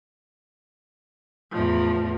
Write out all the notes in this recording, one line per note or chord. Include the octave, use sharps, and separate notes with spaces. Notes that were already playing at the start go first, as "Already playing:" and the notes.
E2 A2 F3